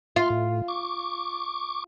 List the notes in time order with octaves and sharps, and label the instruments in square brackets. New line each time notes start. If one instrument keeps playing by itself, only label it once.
[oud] F4 [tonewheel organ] C6
[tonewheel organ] A2
C#6 D6